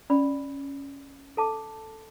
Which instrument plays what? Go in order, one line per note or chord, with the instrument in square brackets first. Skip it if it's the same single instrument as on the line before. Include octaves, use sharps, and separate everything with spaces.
[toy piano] C#4 D5 B5
A4 A5 D6